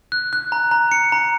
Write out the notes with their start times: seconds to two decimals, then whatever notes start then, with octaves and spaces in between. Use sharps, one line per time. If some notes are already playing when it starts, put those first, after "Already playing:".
0.12 F#6
0.33 F#6
0.52 A#5
0.71 A#5
0.92 C#7
1.12 A#5